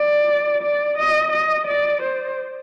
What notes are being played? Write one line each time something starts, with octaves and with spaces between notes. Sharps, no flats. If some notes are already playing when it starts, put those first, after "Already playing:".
Already playing: D5
D5
D#5
D#5
D5
C5